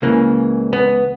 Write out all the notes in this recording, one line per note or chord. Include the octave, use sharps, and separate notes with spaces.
C#2 C#3 E3 A#3
B3